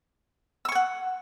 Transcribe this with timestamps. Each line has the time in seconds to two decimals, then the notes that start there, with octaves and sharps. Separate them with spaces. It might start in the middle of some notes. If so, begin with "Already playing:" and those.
0.65 E6
0.69 C#6
0.72 G#5
0.75 F#5